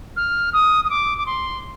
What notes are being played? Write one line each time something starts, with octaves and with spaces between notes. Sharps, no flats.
F6
D#6
D#6
D6
D6
C6